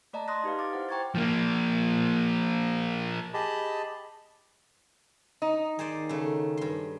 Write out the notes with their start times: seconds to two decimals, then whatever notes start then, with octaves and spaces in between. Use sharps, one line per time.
0.13 A3 D5 D#5 A5 A#5
0.28 C6 D#6 F#6 A#6
0.44 D#4 G4 B4 F5
0.59 D6 A6
0.73 E4 C5 F#5
0.89 C5 G5 A#5 C#6 G#6 A6
1.15 F3 A#3
3.34 G4 G#4 D#5 A5 B5
5.42 D#4
5.79 D#3 G#4 C5 D5
6.09 C#3 A3
6.57 G2 C6